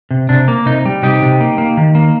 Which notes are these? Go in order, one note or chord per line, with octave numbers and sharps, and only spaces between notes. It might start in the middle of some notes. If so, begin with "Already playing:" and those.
C3
C3 D4
A#3
C3 D#4
G3
C3 D#4 G4
C3
A#3
A#3
D#3
A#3